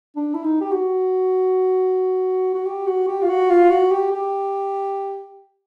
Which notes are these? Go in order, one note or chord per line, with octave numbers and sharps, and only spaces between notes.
D4
E4
D#4
G4
F#4
F#4
G4
F#4
G4
F4
F#4
F4
F#4
G4
G4